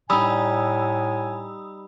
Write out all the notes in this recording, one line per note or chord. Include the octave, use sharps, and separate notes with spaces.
A2 G3 D#4 G#5 B5 D#6 E6